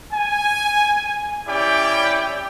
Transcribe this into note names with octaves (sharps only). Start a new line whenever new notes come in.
G#5
C#4 E4 G4 D5 G5